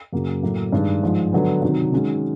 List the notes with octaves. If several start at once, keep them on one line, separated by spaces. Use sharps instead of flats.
F#2 C#3 F#3 A#3
A2 F#3 A#3
G2 D#3 G#3
G#2 F3 G#3
D3 F#3 B3
C3 D#3 F#3
D#3 G#3 C#4 F#4